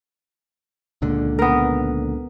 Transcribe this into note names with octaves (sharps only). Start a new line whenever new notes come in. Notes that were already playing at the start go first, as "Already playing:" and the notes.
C#2 A#2 D3
B3 A#4